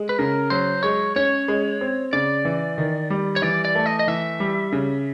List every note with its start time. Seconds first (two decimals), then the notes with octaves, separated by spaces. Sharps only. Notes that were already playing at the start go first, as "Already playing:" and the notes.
Already playing: G#3
0.09 B4
0.18 C#3 A#4
0.50 F#3 C5
0.83 G#3 C#5
1.16 C#4 C#5
1.48 G#3
1.81 C4
2.13 C#3 D5
2.45 E3
2.78 D#3
3.10 G3
3.36 C#5
3.42 E3 D5
3.65 D5
3.75 A3
3.86 D#5
3.99 D#5
4.07 E3 E5
4.40 G3
4.72 C#3